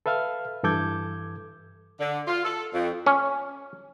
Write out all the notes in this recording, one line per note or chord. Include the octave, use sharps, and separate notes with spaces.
A4 B4 E5 F5 F6
G2 E3 A4 D6 G6 G#6
D3
F4
A4
F2
C#4